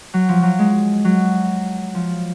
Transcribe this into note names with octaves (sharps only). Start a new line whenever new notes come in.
F#3
F3
F#3
G#3
F#3
F3